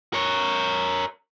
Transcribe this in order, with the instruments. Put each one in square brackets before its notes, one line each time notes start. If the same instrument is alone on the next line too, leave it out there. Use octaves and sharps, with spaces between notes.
[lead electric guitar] A#4 C#5